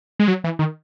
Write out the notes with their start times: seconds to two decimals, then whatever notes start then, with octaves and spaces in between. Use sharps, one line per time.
0.19 G#3
0.28 F#3
0.44 E3
0.59 D#3